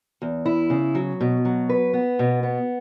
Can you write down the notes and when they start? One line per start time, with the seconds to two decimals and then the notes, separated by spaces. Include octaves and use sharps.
0.22 E2
0.46 E4
0.70 C#3
0.95 F#3
1.21 B2
1.45 F#3
1.69 B4
1.93 B3
2.19 B2
2.43 B3